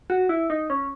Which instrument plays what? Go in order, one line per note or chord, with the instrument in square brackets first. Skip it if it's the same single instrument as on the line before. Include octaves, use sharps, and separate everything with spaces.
[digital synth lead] F#4
E4
D#4
C#4